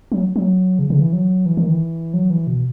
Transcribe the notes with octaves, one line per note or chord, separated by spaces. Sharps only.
F#3
F#3
C#3
C#3
E3
F#3
E3
D#3
E3
F#3
E3
B2